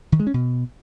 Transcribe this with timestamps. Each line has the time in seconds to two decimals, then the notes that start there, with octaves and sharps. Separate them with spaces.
0.12 D#3
0.20 G#3
0.27 C#4
0.34 B2